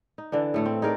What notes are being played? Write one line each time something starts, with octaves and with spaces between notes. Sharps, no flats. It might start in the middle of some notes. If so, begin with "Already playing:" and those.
D#4
D3 E3 D4
A2 A3 C#5
C4
D#4 G#4 A#4 D5